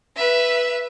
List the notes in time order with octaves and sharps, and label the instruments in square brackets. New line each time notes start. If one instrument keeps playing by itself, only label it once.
[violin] B4 E5